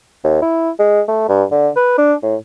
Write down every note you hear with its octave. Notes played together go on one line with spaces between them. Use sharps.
D#2
E4
G#3
A3
G2
D3
B4
D4
A2